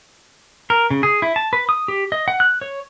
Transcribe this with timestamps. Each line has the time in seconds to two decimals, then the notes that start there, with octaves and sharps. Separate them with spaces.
0.70 A#4
0.90 C#3
1.03 G#4
1.22 E4
1.36 A5
1.53 B4
1.69 D#6
1.88 G4
2.12 D#5
2.28 F#5
2.40 F#6
2.61 C#5